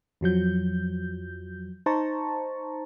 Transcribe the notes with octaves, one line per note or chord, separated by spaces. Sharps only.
F2 F3 F#3 G6
D#4 C5 A5 A#5 C#6